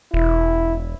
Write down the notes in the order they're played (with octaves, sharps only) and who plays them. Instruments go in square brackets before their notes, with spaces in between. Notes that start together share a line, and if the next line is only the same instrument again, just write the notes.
[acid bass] E1 [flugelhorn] E4